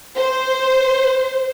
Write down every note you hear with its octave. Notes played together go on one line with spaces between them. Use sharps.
C5